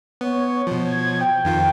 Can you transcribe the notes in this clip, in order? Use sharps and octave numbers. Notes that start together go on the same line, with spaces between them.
B3 C#5
B2 F3
G#6
G5
F2 D#3 F4